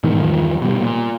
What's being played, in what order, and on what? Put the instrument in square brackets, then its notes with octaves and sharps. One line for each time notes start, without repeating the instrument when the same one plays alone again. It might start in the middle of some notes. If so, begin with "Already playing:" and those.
[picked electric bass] G#2 B2 D#3 E3
E2 G2 D#3 F3
B2 G3
A#2